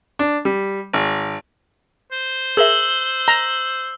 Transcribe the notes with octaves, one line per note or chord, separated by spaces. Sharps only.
D4
G3
G#1
C5
G#4 A#4 E5 E6 F#7 G7
A#5